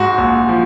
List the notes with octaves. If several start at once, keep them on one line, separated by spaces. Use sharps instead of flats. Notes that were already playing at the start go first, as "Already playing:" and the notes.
Already playing: G#2 F#4
A#1
F3